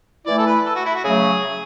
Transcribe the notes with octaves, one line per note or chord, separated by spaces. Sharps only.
E3 A3 E4 D5
A4
B4
A4
F#4
E4
F#4
C#3 F#3 A3 G#4